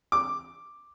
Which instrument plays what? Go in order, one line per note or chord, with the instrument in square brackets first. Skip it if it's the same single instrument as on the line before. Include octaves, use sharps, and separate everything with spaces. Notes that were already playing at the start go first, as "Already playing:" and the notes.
[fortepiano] D6